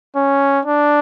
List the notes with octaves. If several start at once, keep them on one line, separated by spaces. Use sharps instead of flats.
C#4
D4